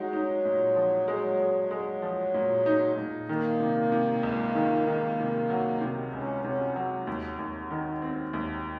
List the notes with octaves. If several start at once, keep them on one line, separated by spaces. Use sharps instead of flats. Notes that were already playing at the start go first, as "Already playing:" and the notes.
Already playing: F#3 G#3 D#4
D#4
A#2
F3
G#3
G#3
G#3
F3
A#2
D#4
A#2
D#3 A#3
C3
C3
C#2
D#3
D#3
C3
F#3
C3
C#2 C#4
C3 C#4
F#3
D#2
D#2
D#3
C4
D#2